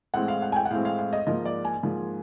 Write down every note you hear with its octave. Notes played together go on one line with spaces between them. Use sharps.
A2 E3 G#3 C4 F#5
F5
F#5
G#5
G5
F#5
A2 E3 G#3 C4 F5
F5
F5
D#5
G#2 F3 A#3 D#5
D5
G#5
G#2 F3 A#3